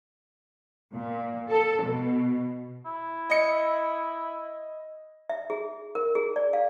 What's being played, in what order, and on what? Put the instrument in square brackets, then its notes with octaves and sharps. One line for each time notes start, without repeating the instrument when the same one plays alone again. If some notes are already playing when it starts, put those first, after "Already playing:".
[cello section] A#2
A4
B2
[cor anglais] E4
[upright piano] D#5 C#7
[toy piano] E5
G#4
A#4
G#4
D5
F5